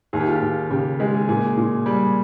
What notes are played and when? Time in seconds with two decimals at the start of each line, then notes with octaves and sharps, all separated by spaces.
0.13 D#2 G#4
0.20 G4
0.28 F4
0.35 G4
0.42 D#2
0.70 C#3 G4
1.00 G#3 G4
1.14 G#4
1.29 A#2 G#4
1.57 A#2
1.86 G3